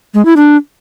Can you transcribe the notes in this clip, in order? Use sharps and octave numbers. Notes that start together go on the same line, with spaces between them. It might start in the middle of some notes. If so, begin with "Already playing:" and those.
G#3
E4
D4